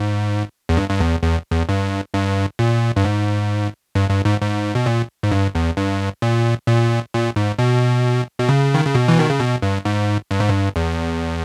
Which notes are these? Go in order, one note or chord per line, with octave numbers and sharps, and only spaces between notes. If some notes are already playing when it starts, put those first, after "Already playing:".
Already playing: G#2
E2
G2
G2
E2
E2
E2
G2
G2
A#2
G2
G#2
G2
G2
G#2
G#2
B2
A#2
G#2
G2
E2
G2
A#2
A#2
A#2
G#2
B2
B2
C#3
D#3
C#3
B2
E3
D#3
C#3
B2
G2
G#2
G2
G#2
G2
E2